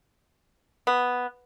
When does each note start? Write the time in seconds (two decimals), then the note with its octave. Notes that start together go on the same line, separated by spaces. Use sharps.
0.87 B3